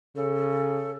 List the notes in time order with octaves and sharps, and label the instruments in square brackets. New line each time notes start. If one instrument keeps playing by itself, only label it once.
[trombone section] C#3 [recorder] A4